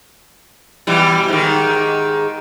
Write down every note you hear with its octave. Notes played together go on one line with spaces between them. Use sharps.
B2 E3 G3
G#2 D#3